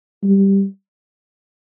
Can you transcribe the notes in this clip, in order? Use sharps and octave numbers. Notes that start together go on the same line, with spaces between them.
G3